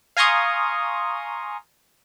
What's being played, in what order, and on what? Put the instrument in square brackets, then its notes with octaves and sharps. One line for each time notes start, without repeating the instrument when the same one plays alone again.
[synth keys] F5 G#5 A#5 C6 C#6 D#6